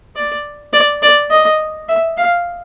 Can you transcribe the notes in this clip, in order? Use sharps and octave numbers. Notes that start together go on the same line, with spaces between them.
D5
D5
D5
D#5
E5
F5